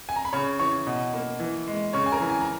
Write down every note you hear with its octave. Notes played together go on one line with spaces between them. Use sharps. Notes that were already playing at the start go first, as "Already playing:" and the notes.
G#5
A#5
B5
C#3 C#5 C#6
E3 C#5 C#6
B2
A#3
E3
G#3
C#3 C#5 C#6
G#5
A#4 A#5
E3
G#5
A#5